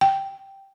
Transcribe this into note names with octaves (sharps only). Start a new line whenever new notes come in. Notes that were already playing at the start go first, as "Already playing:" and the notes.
G5